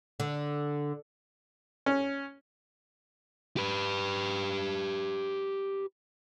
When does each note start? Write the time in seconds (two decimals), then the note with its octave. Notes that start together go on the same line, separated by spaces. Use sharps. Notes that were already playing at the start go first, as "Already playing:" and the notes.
0.20 D3
1.86 C#4
3.57 G4 B4